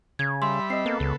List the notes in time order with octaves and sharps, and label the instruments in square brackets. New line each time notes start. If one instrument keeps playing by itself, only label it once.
[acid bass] C#3 [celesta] G#6
[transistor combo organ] G3 E5 B5 [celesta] C6
[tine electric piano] C4 D#5 [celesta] E6 C7
[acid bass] A#3 [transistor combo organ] B3 A4
[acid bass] C#2 [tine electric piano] C#3